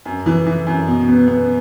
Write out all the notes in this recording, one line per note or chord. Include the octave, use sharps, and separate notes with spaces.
F#2
E3
E3
F#2
B2
B3
B3